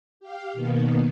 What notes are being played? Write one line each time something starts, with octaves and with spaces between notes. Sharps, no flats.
G4 F5
B2 D#3 A#3 B3